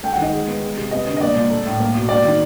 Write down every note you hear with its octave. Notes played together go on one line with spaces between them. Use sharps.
A3 G5
F#5
D#3 D#5
G#3
B3
G#3
C3
B3 D#5
D3
D#5
A#3 D5
A#2
A3
A2
A#3
B2
A#3 D5
D#3